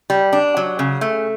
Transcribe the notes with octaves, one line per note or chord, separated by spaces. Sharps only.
G3
D4
F#3
C#3
A3